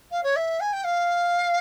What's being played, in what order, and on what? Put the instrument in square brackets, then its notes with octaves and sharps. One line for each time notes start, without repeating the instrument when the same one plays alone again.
[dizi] F5
C#5
E5
G#5
G5
F5